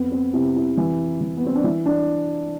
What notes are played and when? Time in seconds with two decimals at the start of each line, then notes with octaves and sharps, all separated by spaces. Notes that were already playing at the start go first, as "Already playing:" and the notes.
Already playing: F2 B3
0.12 C4
0.33 C3 E4
0.56 E4
0.77 E3
1.21 E3
1.37 B3
1.46 C4
1.55 D4
1.64 E3 E4
1.86 D4